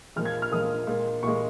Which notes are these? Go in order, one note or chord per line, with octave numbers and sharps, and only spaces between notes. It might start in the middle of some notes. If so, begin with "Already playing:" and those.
A#2 F3 G#3 F6
G#6
F6
A#2 F3 G#3 D#6
A#2 G#3
A#2 G#3 C#6